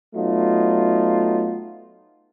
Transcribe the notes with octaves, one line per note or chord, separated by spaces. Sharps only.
F#3 A3 B3 D#4 F4